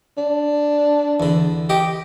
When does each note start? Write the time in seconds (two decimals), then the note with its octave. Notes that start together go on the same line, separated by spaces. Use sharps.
0.17 D4
1.20 E2 D3
1.70 G4 D#5 G5